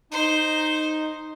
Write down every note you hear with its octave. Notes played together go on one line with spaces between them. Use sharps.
D#4 C5